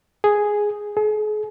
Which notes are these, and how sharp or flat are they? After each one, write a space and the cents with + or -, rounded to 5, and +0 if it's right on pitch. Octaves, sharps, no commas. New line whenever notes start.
G#4 +0
G#4 +40